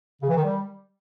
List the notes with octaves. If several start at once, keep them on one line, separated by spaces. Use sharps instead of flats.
C#3
E3
D#3
G3